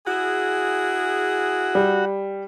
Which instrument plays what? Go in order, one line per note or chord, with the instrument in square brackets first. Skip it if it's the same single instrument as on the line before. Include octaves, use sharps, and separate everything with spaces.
[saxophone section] E4 G#4 [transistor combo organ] F#4
[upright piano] G3